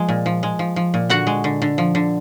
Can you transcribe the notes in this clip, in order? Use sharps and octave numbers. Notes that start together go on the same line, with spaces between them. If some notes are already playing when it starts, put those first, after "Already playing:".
Already playing: F3 G#3
A#2
F3
G#3
F3
F3
A#2
D3 F#4 F#5
G#3
D3
D3
F3
D3